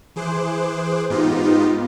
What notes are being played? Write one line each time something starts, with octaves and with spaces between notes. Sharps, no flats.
E3 G#4 C5 D6 F#6
G#2 B3 D#4 F4 G4